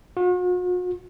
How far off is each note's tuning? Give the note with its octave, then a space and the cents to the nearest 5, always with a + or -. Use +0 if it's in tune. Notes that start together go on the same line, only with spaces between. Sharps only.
F#4 -45